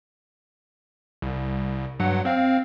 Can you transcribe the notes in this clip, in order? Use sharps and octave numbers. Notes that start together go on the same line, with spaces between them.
C2
G2 F#3 F#5
C4 F5